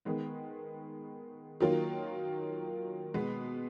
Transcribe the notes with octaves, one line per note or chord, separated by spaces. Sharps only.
D#3 G#3 B3
D#3 F#3 A#3 F4
B2 G#3 B3